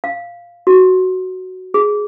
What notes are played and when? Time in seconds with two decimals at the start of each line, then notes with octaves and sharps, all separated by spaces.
0.04 F5
0.67 F#4
1.74 G#4